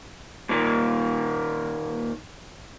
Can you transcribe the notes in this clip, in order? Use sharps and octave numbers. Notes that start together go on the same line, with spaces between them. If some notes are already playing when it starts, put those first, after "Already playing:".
A#2 D#3 A#3